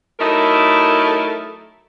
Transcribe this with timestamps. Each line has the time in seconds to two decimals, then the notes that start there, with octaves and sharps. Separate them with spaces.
0.20 F#3 A3 D#4 E4 A4 A#4